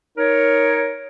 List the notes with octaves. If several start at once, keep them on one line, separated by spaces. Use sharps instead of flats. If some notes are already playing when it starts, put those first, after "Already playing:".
D#4 A#4 C#5